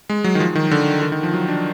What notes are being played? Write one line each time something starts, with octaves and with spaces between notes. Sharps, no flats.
G#3
F#3
D#3
F3
D#3
D3
D#3
D#3
F3
F#3
D4